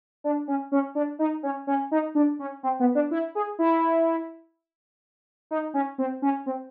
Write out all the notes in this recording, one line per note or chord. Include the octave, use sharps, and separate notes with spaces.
D4
C#4
C#4
D4
D#4
C#4
C#4
D#4
D4
C#4
C4
B3
D4
E4
G#4
E4
D#4
C#4
C4
C#4
C4